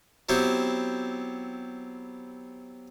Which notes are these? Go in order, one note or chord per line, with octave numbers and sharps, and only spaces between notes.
F#3 B3 C4 E4 G4